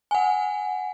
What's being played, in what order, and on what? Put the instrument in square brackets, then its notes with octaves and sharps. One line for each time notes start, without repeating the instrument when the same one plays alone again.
[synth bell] F#5 G#5